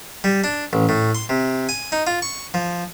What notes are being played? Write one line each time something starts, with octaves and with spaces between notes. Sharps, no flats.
G3
D4
A1
A2
C6
C3
G#5
D#4
F4
C#6
F3